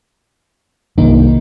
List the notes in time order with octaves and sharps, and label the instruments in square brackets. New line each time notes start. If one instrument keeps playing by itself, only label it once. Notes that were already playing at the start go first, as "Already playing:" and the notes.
[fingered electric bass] C2 G2 [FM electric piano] D#3 A#3 D#4